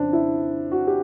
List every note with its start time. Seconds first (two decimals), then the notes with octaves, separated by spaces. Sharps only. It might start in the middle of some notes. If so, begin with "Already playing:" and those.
Already playing: F2 C#3 F3 C4 D4
0.13 E4
0.72 F#4
0.87 G4